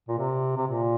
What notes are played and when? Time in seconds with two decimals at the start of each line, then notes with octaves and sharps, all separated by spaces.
0.09 A#2
0.18 C3
0.57 C3
0.68 A#2